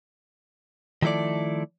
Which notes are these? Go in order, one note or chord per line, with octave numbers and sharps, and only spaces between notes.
D#3 F3 A3 E4 A4 D5